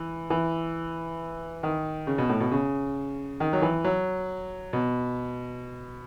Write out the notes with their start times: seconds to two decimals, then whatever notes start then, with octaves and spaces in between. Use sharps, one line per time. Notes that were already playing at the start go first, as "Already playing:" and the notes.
Already playing: E3
0.30 E3
1.63 D#3
2.07 C#3
2.18 B2
2.29 A2
2.40 B2
2.51 C#3
3.40 D#3
3.53 F#3
3.62 E3
3.85 F#3
4.73 B2